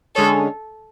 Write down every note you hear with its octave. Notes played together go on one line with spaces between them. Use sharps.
D3 G#3 C#4 G#4 A4 C#5